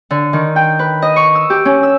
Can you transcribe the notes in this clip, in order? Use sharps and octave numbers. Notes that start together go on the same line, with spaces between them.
D3
D#3
G5
B4
D#5
C#6
E6
G4
C#4
E6